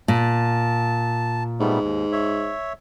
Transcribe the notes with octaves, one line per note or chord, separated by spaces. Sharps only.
A#2 A5
G#2 G3 A3 B3
D#2
C#5 E5